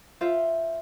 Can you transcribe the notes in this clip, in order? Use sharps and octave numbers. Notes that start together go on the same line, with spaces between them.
F4 C5 E5